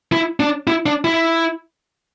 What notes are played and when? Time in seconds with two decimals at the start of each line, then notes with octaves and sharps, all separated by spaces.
0.12 E4
0.40 D4
0.67 E4
0.86 D4
1.04 E4